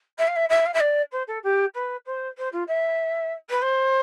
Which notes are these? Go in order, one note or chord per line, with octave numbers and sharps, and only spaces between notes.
E5
F5
E5
E5
F5
E5
D5
C5
A4
G4
B4
C5
C5
F4
E5
B4
C5